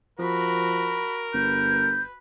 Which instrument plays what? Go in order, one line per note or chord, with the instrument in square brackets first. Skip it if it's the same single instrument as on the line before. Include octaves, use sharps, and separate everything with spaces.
[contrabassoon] F3 [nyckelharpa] F#4 B5 [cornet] A#4
[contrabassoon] G1 [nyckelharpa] B4 [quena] G6